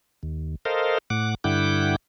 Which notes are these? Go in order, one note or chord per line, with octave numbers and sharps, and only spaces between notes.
D#2
A4 A#4 C5 D#5 F5
A2 F#5 D6
G2 D3 E4 F#5 G5 D6